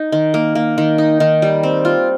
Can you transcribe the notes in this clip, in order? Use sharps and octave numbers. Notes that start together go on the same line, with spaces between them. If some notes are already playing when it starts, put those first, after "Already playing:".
Already playing: D#4
D#3
A#3
A#3
D#3
D#4
D#3
G3
C4
F4